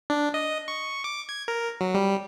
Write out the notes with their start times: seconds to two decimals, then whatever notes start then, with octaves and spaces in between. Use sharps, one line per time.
0.10 D4
0.34 D#5
0.68 C#6
1.04 D6
1.29 G#6
1.48 A#4
1.81 F#3
1.94 G3